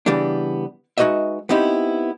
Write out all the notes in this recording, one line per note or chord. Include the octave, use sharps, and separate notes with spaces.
C#3 E3 G3 B3 D4
G#3 D#4 F#4 B4 D#5 E5
B3 C4 D#4 E4 G4